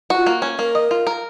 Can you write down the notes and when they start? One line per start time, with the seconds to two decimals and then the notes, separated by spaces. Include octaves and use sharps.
0.10 F4 F#4
0.27 A#3
0.42 C#4
0.59 A#3 A#4
0.75 D#5
0.91 F4
1.07 A#4